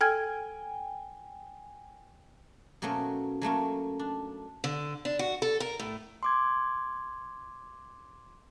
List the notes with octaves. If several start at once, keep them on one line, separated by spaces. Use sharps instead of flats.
A4 G5 G#5 F6 G#6
B2 F#3 A3 A#3 C#4
F#3 A3 A#3 C#4
D4
D3
D4
F#4
A4
A#4
A2
C6 D6 G#6